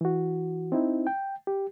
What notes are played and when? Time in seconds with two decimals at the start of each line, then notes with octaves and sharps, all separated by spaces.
0.01 E3 F#4
0.72 C4 D#4 E4
1.07 G5
1.47 G4